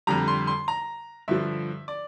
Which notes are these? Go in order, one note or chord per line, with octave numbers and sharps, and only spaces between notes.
F2 D3 G3 A#5
C6
C6
A#5
G2 D3 F3 E5
D5